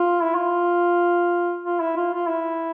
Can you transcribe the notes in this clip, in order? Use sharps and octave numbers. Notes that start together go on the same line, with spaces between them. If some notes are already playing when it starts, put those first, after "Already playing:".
Already playing: F4
E4
F4
F4
E4
F4
F4
E4